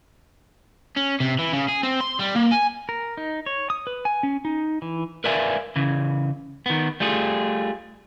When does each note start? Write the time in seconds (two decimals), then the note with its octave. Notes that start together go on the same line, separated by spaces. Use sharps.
0.97 C#4
1.20 C3
1.39 E3
1.53 C#3
1.68 G#4
1.83 C4
2.00 C6
2.19 G3
2.35 A#3
2.51 G#5
2.89 A#4
3.17 D#4
3.46 C#5
3.70 D#6
3.87 B4
4.05 G#5
4.23 C#4
4.45 D#4
4.82 E3
5.24 A#4 B4 D5 E5 F5 G#5
5.76 C#3 E3
6.66 D#3 B3
7.00 G3 A3 F4 G#4